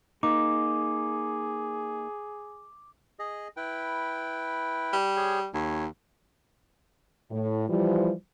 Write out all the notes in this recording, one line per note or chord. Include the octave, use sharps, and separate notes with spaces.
A#3 D#4 G#4 D6
G#4 D#5
E4 B4 G5
G3
G#4 C#5 G5
D#2 C#5
A2
E3 F3 G3